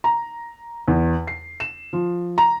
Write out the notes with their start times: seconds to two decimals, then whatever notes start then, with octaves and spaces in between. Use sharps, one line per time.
0.04 A#5
0.88 E2
1.27 C7
1.60 E7
1.93 F3
2.38 A#5